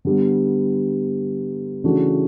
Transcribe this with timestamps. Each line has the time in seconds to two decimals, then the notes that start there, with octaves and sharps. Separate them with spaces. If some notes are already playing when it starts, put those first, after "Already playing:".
0.05 D3 G3 B3
1.84 C#3 E3 A3 D4 F#4